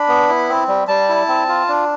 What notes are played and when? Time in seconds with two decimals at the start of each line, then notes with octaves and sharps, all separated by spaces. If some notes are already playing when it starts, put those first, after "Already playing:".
Already playing: D4 B5
0.08 B3
0.29 E4
0.49 C4
0.68 G3
0.88 G3 A5
1.09 E4
1.28 C4
1.49 F4
1.69 D4